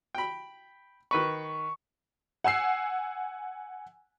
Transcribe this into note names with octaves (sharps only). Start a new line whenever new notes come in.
G5 B5
D#3 B4 B5 C#6
F#5 G#5 E6 C7